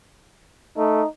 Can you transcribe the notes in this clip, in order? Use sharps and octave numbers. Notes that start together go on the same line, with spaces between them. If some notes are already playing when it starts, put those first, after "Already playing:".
A3 D#4